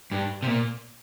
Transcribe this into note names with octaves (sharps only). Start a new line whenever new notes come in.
G2
C3
A#2